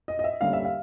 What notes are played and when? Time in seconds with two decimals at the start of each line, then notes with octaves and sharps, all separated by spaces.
0.08 D#5
0.19 D#5
0.24 E5
0.41 D3 G3 A#3 C#4 F5
0.53 E5
0.65 F5